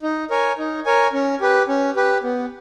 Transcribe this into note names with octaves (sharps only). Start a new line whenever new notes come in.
D#4
A#4 C#5 G#5
D#4
A#4 C#5 G#5
C#4
G4 B4
C#4
G4 B4
B3